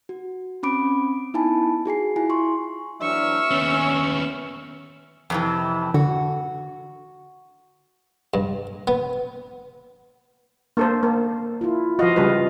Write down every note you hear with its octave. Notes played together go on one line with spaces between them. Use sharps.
F#4
C4 C#4 B5 D6 D7
B3 D#4 E4 G#5 A5 B5
F#4 G#4 G#5 C7
E4 F4 G#5
C6 C#6
E3 F#3 D4 E5 C#6 E6 F6
D#2 B3 C#4
F2 C3 E3
D3 F#4
G2
B3
A#3 D4 A4 C5
A#3
E4 F4
F3 F4 F#4 D#5 F5
C#3 G3 B4